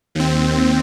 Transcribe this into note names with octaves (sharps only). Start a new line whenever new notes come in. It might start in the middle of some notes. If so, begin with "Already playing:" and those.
D#2 C4